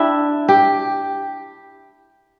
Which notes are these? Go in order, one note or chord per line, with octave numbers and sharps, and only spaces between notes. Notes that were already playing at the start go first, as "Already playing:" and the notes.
Already playing: D4 E4 G4
G4